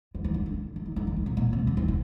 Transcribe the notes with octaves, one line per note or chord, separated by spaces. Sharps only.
D3
D#3
D3
D3
D3
D#3
D3
D#3
D3
C3
A#2
C3
D3
D#3
D3